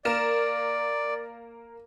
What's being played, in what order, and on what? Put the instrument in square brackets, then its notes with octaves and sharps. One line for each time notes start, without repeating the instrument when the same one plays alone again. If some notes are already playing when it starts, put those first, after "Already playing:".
[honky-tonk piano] A#3 A#4 E7 [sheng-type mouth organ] D5